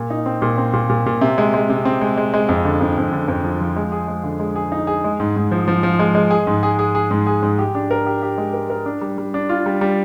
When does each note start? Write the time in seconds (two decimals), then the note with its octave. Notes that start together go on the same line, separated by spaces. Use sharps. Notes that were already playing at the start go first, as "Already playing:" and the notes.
Already playing: A#2
0.10 D#4
0.26 C4
0.42 A#2
0.58 C4
0.73 A#2
0.90 A#2
1.06 A#2
1.21 C3
1.38 G#3
1.54 G#3
1.69 C3
1.85 C4
2.01 G#3
2.17 G#3
2.34 G#3
2.49 F2
2.65 D3
2.81 F2
2.97 F2
3.13 D3
3.28 F2
3.44 F3
3.61 F3
3.76 G#3
3.92 G#4
4.08 G#3
4.24 D3
4.40 G#3
4.56 G#4
4.72 D#4
4.87 G#4
5.04 G#3
5.20 G#2
5.36 G#2
5.51 F3
5.68 F3
5.83 F3
5.99 G#3
6.15 G#3
6.31 G#4
6.47 G#2
6.63 G#4
6.79 G#4
6.95 G#4
7.11 G#2
7.27 G#4
7.42 G#2
7.58 G4
7.75 D4
7.91 A#4
8.06 G4
8.22 G4
8.38 G#3
8.54 A#4
8.70 A#4
8.86 D4
9.01 G3
9.18 G3
9.34 D4
9.49 F4
9.66 G3
9.81 G3